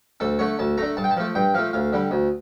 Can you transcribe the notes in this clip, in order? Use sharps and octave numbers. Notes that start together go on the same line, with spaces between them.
D2 A4
D3 A3 C#5
D2 A5
D3 A3 A#5
G2 A5
G5
A5
F3 A3
G2 G5
F3 A3 F5
D2 F5
D3 G3
D2